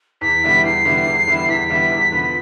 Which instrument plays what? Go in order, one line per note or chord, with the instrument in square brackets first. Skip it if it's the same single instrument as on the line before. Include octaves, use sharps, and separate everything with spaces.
[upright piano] E2 [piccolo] B6
[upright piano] D3 G3 B3 E4
[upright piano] E2 [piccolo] C7
[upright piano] D3 G3 B3 E4
E2
D3 G3 B3 E4
[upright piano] E2 [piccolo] B6
[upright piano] D3 G3 B3 E4
E2
D3 F3 B3